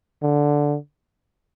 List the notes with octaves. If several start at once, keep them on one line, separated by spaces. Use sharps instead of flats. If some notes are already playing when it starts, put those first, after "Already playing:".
D3